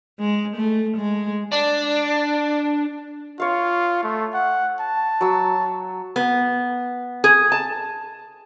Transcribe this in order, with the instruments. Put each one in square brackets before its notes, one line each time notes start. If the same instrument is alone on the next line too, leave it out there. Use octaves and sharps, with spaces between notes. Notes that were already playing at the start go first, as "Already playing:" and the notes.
[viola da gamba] G#3
A3
G#3
[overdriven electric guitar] D4
[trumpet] F4 [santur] C#5 F5
[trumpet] A3
F#5
A5
[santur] F#3 E6
[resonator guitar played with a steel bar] B3
G#4
A5